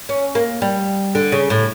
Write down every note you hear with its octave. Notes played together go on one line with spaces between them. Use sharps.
C#4
A#3
G3
D3
C#3
A2